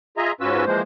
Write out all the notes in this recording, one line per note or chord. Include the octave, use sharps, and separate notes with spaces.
F4 G#4 D#5 E5 A#5
G#2 C#4 F4 F#4 B4 E6
E3 F3 G#3 A#3 C5